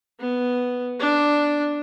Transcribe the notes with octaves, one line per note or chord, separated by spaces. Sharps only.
B3
D4